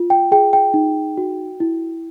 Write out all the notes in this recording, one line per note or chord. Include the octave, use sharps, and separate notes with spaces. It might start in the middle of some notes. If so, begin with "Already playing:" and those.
Already playing: F4
G5
G#4 G5
G5
D#4
F#4
E4